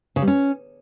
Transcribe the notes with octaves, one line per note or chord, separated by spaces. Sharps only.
C#3
G3
C#4